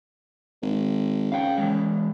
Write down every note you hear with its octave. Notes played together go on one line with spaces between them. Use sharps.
G#1
C#3 F5 G5
E3 F3 G#3